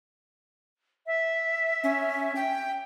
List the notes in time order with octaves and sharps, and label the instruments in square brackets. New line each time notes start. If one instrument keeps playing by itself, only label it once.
[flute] E5
[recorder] C#4
G5